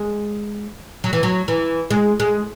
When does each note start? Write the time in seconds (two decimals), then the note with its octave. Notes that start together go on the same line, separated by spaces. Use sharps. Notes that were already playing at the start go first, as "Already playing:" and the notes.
Already playing: G#3
1.04 F#3
1.13 E3
1.23 F#3
1.48 E3
1.91 G#3
2.20 G#3